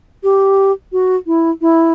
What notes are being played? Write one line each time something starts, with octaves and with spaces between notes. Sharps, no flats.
G4
F#4
E4
E4